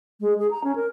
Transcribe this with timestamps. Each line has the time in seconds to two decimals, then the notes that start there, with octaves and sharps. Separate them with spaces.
0.20 G#3
0.39 G#4
0.51 A#5
0.64 C#4
0.75 A#4